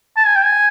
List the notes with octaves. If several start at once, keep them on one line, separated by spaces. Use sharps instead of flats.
A5
G#5
G5
G#5